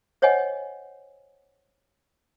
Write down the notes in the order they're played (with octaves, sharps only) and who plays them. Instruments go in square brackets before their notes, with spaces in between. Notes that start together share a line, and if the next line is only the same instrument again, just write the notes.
[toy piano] C5 C#5 D#5 F#5 G#5